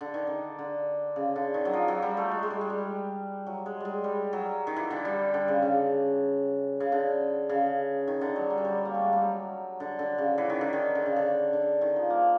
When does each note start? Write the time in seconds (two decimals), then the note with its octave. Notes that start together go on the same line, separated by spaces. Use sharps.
0.01 D3
0.14 D#3
0.27 D3
0.59 D3
1.16 C#3
1.36 D3
1.54 D#3
1.65 F#3
1.73 F3
1.88 F#3
2.02 G3
2.17 A3
2.31 G#3
2.43 G#3
2.50 G3
2.61 G#3
2.70 G3
3.47 F#3
3.66 G#3
3.80 G3 G#3
4.04 G3
4.33 F#3
4.67 D#3
4.76 E3
4.90 D3
5.05 G3
5.34 D3
5.48 C#3
5.63 C#3
6.80 C#3
6.92 D3
7.49 C#3
8.07 D#3
8.21 D3
8.36 F#3
8.50 G3
8.58 F#3
8.65 G3
8.85 A#3
8.94 A3
9.04 G#3
9.13 G3
9.23 F#3
9.80 D3
9.99 D3
10.18 C#3
10.38 E3
10.50 D#3
10.61 D3
10.73 D#3
10.95 D3
11.06 C#3
11.16 D3
11.53 D3
11.81 D#3
11.96 F3
12.10 A#3